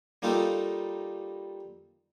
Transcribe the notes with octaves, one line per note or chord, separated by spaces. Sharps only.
G3 A#3 D#4 F4 G4 A4